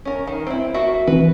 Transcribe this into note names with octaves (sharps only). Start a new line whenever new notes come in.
C#4 A#4
D#3
C4 E4
A#3 F#4 E5
E3 C4 B4